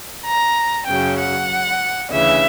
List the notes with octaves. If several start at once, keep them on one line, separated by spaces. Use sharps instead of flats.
A#5
F#2 C#3 F#3 G5
F#5
D2 C#3 E3 E5